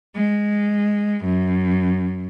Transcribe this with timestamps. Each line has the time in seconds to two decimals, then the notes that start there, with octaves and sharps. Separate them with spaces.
0.14 G#3
1.24 F#2